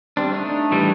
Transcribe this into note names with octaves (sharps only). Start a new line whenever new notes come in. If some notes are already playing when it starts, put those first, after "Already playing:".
G3 C4 D4
A3 D4 D#4
A2 E3 G3